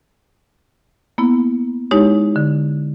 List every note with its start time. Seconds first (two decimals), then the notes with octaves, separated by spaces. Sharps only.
1.18 A#3 B3 E4
1.91 G#3 D#4 E4 G4 C#5
2.36 D3